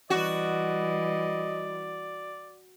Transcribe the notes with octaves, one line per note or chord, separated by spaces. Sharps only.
E3 G3 F#4 D5 D#5